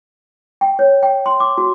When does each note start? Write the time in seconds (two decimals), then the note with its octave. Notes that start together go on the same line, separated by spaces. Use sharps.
0.61 G5
0.79 C#5
1.03 G5
1.26 C6
1.40 D6
1.58 F#4